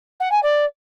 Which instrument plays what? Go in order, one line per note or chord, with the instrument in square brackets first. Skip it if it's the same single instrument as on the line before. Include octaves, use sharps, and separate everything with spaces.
[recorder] F#5
G#5
D5